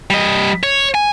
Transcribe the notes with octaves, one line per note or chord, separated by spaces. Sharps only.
G3 D#5
C#5
G#5